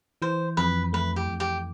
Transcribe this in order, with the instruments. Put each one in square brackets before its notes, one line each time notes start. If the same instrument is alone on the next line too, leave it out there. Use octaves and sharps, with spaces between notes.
[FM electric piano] E3 [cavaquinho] C5
[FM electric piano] F2 [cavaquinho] B4
[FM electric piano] A3 [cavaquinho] B4
[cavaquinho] G4
[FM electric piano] F2
[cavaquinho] G4